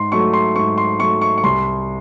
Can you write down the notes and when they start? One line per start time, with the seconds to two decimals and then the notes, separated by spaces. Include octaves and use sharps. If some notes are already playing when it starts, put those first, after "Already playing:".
Already playing: G#2 C6
0.12 F#3 A3 C#6
0.33 C6
0.56 G#2 C#6
0.78 C6
0.99 F#3 A3 C#6
1.22 C#6
1.38 C#6
1.44 C2 C6